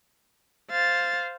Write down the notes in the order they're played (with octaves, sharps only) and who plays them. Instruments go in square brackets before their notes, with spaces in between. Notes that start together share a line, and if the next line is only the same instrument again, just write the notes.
[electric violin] C5 F5 [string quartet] A6